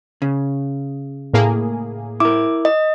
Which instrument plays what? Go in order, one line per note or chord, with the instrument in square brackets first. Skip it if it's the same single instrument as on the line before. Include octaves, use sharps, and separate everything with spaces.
[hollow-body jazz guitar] C#3
[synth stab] A2 A#3 G#4
[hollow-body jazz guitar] E4 A#4 [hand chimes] D6
[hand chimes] D#5